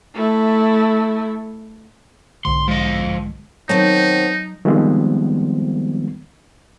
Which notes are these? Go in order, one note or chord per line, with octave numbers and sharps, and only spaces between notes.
A3 E4
B1 G#2 D3 C6
F3 G#3 D#5
D#3 F#3 B3 C4 D#4 C#5 A5
D#3 F3 G3 G#3 B3 C4